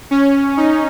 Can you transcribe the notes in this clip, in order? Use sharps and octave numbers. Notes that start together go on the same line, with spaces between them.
C#4
D#4